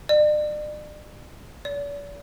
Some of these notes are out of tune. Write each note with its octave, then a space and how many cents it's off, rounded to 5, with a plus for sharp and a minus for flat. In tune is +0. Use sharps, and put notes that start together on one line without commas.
D5 +40
D5 -45